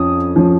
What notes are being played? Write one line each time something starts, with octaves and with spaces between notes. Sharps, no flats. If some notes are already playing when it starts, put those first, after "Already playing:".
Already playing: F2 F3 C#4 D#6
F3 C#4